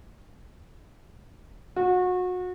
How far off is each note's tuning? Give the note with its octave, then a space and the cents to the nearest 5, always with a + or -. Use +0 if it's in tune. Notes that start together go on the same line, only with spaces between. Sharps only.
F#4 -30